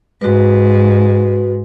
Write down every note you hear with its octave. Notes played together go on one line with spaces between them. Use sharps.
G#2 F#4 B4